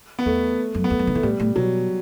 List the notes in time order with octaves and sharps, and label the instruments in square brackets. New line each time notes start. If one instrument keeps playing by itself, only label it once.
[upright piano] B3
[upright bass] E2 [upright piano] A3
[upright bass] F#2
[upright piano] B3
[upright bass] E2 [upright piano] A3
[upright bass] F#2
D3
[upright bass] E3 [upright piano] A3
[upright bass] A2 [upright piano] G3
[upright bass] A2
[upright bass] B2 [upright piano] F#3